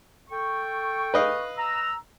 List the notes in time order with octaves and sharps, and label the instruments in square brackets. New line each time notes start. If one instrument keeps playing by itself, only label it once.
[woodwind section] A4 G5 C#6
[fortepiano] B4 D#5 F5
[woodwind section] A#5 E6